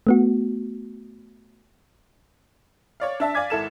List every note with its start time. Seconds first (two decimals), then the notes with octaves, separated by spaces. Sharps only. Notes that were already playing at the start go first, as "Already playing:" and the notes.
0.07 A3 B3 F#4
3.00 C#5 D5 F5
3.20 D4 E5 A5
3.34 D5 F5 G#5 D6 G#6 B6
3.50 G#1 E4 A4 E7